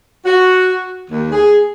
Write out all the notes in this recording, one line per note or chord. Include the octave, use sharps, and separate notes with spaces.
F#4
D#2
G#4